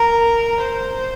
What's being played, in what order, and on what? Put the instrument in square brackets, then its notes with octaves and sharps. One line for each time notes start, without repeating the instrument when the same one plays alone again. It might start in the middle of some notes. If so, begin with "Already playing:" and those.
Already playing: [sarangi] A#4
C5